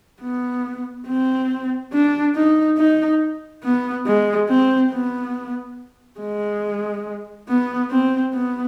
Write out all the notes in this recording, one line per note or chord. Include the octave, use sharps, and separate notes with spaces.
B3
C4
D4
D#4
D#4
B3
G#3
C4
B3
G#3
B3
C4
B3